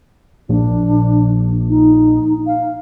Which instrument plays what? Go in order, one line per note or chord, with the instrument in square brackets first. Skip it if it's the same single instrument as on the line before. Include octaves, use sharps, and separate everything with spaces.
[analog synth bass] A#1 [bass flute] D4
[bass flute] D#4
F5